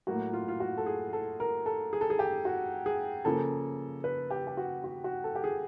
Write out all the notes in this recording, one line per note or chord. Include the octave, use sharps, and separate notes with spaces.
A2 F#3 A#3 F#4
F4
F4
F#4
A4
G#4
A4
A#4
A4
G#4
A4
G#4
G4
F#4
G#4
C#3 F3 A#3 A4
B4
G4
G4
F#4
F#4
F#4
A4
G4
G#4